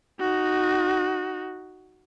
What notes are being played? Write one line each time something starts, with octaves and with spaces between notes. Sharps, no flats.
D#4 F#4